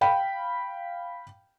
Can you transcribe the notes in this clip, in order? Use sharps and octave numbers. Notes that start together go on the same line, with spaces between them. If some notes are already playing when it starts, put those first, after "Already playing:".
F5 G5 B5